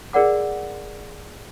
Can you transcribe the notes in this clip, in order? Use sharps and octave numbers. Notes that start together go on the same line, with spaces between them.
G#4 A#4 D5 F#5 D6